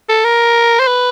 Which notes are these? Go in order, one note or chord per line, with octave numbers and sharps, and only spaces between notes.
A4
A#4
C5
B4